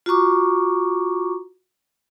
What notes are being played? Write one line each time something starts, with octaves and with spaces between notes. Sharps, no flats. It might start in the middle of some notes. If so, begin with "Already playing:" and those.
F4 F#4 A#5 C#6 D6